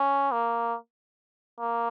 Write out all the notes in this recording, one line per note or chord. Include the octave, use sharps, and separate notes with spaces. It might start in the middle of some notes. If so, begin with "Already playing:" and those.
Already playing: C#4
A#3
A#3